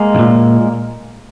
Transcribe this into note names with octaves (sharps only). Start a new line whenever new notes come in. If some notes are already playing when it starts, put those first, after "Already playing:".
Already playing: G#3 A#3
B1
A#2